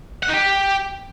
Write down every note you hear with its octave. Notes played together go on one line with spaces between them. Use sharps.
F#5
D#4
G4